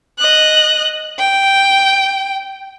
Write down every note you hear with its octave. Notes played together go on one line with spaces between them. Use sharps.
D#5 F#6
G5